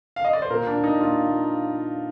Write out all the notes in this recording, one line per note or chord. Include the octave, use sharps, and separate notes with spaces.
F5
D#5
D5
C5
A#2 A#4
D4
A#2
D#4
A#2 F4
A#2